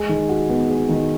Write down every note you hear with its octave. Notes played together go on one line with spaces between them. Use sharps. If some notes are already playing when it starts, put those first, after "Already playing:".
Already playing: G#3
D#3
F#4
B3
G#3
D#3